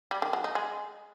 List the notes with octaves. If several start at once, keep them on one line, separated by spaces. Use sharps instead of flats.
G3
D#3
F#3
D#4
G#3